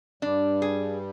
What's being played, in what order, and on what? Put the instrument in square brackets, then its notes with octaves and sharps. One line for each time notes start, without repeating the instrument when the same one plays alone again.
[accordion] G2 G3 [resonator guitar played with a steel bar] D4
[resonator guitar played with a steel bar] G#4